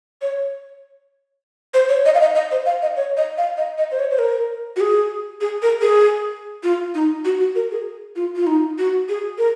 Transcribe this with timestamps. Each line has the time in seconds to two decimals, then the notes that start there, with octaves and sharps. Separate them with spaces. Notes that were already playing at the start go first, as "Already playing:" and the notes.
0.22 C#5
1.74 C5
1.89 C#5
2.05 D#5
2.15 F5
2.21 D#5
2.35 D#5
2.52 C5
2.66 F5
2.82 D#5
2.96 C#5
3.17 D#5
3.38 F5
3.57 D#5
3.78 D#5
3.92 C5
3.99 C#5
4.11 C5
4.19 A#4
4.76 F#4
4.81 G#4
5.41 G#4
5.62 A#4
5.82 G#4
6.63 F4
6.95 D#4
7.25 F#4
7.40 F#4
7.55 A#4
7.71 G#4
8.16 F4
8.36 F4
8.47 D#4
8.78 F#4
9.09 G#4
9.38 A#4